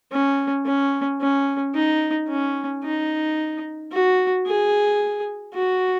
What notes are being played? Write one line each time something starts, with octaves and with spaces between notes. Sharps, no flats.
C#4
C#4
C#4
D#4
C#4
D#4
F#4
G#4
F#4